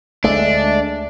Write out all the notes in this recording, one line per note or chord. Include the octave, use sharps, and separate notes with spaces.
D2 G#3 A3 D4